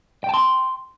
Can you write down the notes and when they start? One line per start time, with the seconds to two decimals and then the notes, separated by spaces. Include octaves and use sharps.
0.24 G5
0.29 A5
0.34 C6